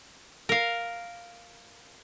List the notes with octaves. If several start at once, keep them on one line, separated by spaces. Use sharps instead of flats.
A#4 F5